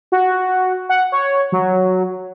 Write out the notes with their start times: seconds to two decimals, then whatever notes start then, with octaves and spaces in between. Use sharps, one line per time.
0.12 F#4
0.89 F#5
1.12 C#5
1.52 F#3